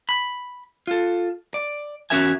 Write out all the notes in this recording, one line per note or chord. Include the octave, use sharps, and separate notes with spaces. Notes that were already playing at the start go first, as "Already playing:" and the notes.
B5
F4 A4
D5
E2 C#4 F#4 A#4 E5 G#5